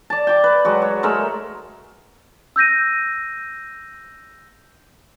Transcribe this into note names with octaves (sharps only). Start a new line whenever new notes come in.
D5 A5
G5 D6
B4
F#3 G#3 F#4
C#5
G#3 A3 A#4 E5
E6 G6 A#6 D#7